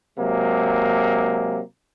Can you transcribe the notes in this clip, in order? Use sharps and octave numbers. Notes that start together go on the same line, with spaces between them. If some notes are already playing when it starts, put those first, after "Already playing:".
C3 F#3 G#3 A#3